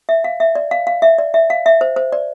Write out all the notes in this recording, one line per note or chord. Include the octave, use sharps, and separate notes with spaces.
E5
F5
E5
D5
F5
F5
E5
D5
E5
F5
E5
C5
C5
D5